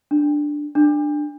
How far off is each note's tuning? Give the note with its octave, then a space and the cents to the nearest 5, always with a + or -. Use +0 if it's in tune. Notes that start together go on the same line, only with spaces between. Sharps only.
D4 +5
D4 +20